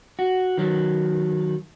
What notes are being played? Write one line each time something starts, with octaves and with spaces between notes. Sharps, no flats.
F#4
D#3 F#3